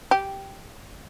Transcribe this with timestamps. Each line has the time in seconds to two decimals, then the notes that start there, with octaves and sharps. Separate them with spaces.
0.11 G4